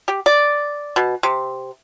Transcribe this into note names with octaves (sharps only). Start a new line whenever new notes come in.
G4
D5
B2
C3